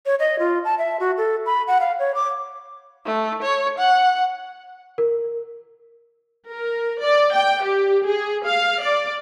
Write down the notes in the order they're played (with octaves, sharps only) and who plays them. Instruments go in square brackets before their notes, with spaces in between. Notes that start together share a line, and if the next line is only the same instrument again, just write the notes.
[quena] C#5
D#5
F4
A5
E5
F#4
A4
B5
F#5
F5
C#5
D6
[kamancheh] A3
C#5
F#5
[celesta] A#4
[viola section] A#4
D5
G5
G4
G#4
F5
D5